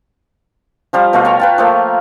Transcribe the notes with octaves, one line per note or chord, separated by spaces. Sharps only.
F3 G3 F4 A#5
B2 A3 F4
C#5 F5 G5 A#5
B4 G5 A5
F3 A3 A#3